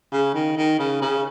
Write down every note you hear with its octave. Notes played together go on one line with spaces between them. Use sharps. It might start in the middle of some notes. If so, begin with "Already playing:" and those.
C#3
D#3
D#3
C#3
C#3